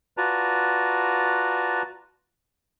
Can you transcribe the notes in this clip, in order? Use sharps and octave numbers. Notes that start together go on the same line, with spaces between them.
F4 F#4 B4 D5 A5 A#5